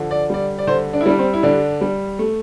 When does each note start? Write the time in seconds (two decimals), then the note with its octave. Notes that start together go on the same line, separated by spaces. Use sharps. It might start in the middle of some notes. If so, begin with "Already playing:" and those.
Already playing: D3 F3
0.11 D5
0.30 G3 D5
0.59 D5
0.67 D3 C5
0.93 D4
1.01 E4
1.06 G3 D4
1.19 C4
1.33 E4
1.43 D3 D4
1.81 G3
2.19 A3